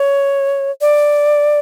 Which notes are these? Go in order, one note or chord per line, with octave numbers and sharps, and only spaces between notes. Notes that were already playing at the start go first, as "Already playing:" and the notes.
Already playing: C#5
D5